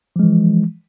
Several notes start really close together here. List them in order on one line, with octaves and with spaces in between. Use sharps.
F3 G#3 E3